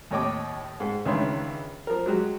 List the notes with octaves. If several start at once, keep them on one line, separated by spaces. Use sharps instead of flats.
D#2 A2 C#5 D#5 G5 D6
G#2 G5
C#2 D#3 E3 D4 C#5 C6
F3 A#4
F#3 G#3 F#4 G4